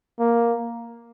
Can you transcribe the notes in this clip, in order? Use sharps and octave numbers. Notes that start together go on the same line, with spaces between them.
A#3